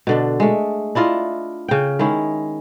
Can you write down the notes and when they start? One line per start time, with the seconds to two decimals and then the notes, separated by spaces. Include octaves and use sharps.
0.07 B2 D3 D4
0.40 G#3 A3
0.95 D4 E4 F4 D#5
1.68 C#3 G5
1.99 D#3 G#3 C#4 E4